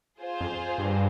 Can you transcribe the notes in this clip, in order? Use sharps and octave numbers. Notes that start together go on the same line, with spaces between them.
F4 G#4 C5
F2
G2